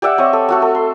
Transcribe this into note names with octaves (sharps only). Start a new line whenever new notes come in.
G4 D5 E5 F#5
C4 C#5 D#5 E5
A4
A3 F#4 A4
A4
C6